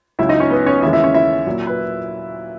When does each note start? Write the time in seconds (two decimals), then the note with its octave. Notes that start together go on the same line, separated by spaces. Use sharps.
0.19 C#2 C#3 F#3 E4 E5
0.29 D#4 D#5
0.40 C#4 C#5
0.50 B3 B4
0.66 C#4 C#5
0.82 D#2 C#3 E3 G#3 E4 E5
0.93 E4 E5
1.04 C#4 C#5
1.14 E4 E5
1.47 A#2 F#3
1.67 B4